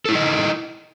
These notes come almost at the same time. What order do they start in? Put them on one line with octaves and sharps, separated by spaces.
A4 E4 D#4 D#5